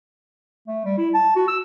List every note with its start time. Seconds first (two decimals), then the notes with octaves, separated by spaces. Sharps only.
0.67 A3
0.85 G3
0.98 E4
1.14 A5
1.36 F#4
1.48 E6